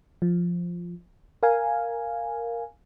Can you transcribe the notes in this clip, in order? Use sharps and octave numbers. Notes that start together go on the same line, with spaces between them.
F3
A#4 F5 G#5